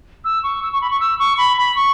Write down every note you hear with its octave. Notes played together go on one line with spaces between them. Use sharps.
E6
C#6
E6
C#6
B5
C#6
E6
C#6
B5
B5
C#6